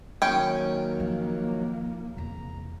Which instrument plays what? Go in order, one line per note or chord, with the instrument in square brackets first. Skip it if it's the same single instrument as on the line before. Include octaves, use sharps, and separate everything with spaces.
[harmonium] D#3 F#3 [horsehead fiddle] A#3 [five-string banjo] C#4 G5
[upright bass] F3
[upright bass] E2 C3 [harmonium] A#5